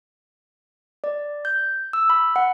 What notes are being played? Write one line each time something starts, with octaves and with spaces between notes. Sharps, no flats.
D5
G6
E6
B5
F#5